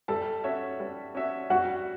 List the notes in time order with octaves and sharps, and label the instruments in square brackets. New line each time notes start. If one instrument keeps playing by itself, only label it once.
[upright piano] G3 [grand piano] A4 A5
[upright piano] C#4 F#4 C#5 E5
G3
C#4 F#4 C#5 E5
[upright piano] G3 [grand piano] F#4 F#5